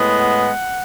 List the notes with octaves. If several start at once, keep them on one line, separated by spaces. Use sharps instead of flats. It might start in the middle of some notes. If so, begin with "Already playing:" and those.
Already playing: A2 G#3 B3
F#5